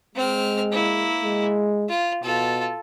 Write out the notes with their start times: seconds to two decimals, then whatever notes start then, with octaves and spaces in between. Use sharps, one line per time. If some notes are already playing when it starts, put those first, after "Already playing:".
0.15 G#3 C4 F6
0.72 A#3 E4
1.23 G#3
1.89 F4
2.23 B2 F4 A4